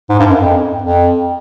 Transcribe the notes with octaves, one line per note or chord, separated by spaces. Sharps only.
G#2
G2
F#2
F2
F2